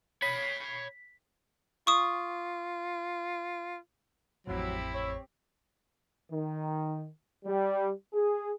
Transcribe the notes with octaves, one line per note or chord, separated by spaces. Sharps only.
C#5 B5 B6
F4 C#6 D#6
A1 F2 A2 F#3 C4 E4 G4
C#5
D#3
G3
G#4